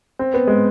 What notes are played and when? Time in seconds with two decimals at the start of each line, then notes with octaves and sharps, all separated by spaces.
0.19 C4
0.34 B3
0.47 G#3